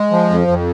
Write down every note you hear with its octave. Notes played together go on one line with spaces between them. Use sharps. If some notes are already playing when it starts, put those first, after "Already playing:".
Already playing: G#3
F3
F2
F2